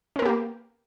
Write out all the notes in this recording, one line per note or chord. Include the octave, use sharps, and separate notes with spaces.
A#3 B3 C#4 G4 A#4